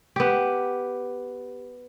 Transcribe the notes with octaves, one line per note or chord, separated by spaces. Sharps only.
B3 G4